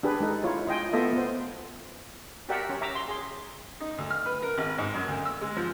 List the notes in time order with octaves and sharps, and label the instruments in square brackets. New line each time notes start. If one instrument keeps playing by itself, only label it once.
[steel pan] D4 G4 G#4 B4
G#3 D#4 A4
E4 F4 C#5
F4 D#5 G5 G#5
A3 B3 F4 A4 D#5 E5
B3 C5
F#4 G4 A#4 D5 E5 F#5
C#4
E5 A#5 D6
C6
G#4 C6
[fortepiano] D#4
D2
F6
B4
A#4
G#1
G#2
F#2
D2
E6
G#3
F3